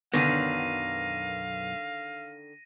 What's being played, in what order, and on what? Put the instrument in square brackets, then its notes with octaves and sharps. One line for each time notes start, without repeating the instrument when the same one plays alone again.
[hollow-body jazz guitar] B1 F#2 B3 [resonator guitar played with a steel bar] D3 D#3 [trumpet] F5 [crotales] A#6 D#7